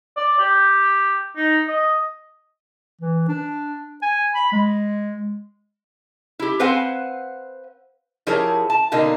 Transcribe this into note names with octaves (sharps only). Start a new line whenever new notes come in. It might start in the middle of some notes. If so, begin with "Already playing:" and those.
D5
G4
D#4
D#5
E3
D4
G#5
B5
G#3
E4 G4
C4 B4 C5 F5 F#5 G#5
F3 E4 G4 G#4 A#4 C#5
A5
B2 D3 A#3 D#4